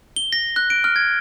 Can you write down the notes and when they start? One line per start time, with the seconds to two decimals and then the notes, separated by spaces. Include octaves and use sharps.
0.16 G7
0.33 A#6
0.56 F#6
0.70 D7
0.84 F6
0.96 G#6